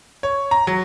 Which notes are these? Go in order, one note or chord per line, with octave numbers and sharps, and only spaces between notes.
C#5
A#5
F#3